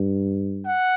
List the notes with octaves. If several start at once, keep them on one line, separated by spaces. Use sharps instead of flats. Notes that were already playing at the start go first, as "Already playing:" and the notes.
Already playing: G2
F#5